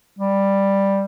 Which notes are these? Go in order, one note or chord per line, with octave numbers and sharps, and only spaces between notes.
G3